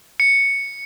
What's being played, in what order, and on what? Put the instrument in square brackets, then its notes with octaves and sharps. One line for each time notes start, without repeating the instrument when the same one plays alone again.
[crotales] C#7